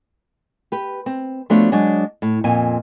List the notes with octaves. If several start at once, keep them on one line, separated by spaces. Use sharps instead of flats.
G4 B4
C4
F3 A3 B3 D4 F#4 C#5
F#3 G#3 D4
A2
F2 A#2 G#5